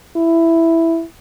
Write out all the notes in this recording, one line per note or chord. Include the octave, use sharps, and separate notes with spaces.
E4